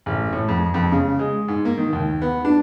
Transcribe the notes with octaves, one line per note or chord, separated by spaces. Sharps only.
A1
A2
F2
F2
C#3
G#3
G#2
A#3
D#3
D#2
B3
D4